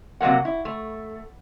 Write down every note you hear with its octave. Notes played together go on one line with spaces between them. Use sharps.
C3 F#3 A3 A#3 F#5
E4
A3